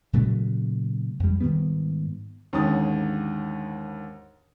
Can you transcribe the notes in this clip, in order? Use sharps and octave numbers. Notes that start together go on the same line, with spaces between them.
A#2 C#3 F#3 A3
F2 G3
G#2 D#3 G3 B3
D#2 G#2 D3 C#4 D#6 A6